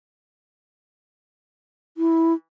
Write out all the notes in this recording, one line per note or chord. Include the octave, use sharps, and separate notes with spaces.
E4